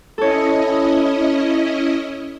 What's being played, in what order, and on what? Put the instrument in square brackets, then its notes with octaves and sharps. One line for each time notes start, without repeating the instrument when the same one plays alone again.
[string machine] C#4 E4 D#5 [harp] A4 C#5